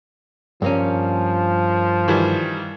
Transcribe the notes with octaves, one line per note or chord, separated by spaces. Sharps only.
G2 F3 A#3 C#4
D#3 E3 G3